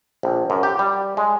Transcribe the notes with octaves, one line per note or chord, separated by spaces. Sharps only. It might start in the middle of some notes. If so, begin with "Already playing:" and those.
A#1
F#2
G4
G3
G#3